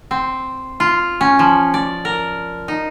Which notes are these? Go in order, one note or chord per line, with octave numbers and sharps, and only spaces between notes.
C4
F4
C#4
F3
D5
A#4
D#4